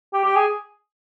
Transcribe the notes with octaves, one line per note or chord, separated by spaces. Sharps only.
G4
G4
G#4